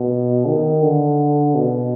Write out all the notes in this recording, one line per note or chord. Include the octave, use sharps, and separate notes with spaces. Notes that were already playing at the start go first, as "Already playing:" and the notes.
Already playing: B2
D#3
D3
B2